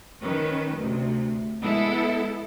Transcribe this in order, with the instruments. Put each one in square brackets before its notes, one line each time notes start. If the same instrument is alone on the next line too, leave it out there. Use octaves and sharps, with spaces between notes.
[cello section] D#3 C#4 B4
D2 C3
G#3 B3 E4 A4